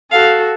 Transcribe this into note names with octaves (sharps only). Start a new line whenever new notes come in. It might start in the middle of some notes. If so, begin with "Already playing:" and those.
F#4 A4 F5